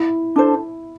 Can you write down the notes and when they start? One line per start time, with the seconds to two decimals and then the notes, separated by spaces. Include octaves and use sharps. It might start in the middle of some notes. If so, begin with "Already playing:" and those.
Already playing: E4
0.36 D4 A4 C5